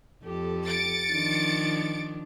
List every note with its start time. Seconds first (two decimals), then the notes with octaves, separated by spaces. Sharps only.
0.24 F2 G4 A4
0.64 A6 C#7 D7
1.13 D#3 F3 D4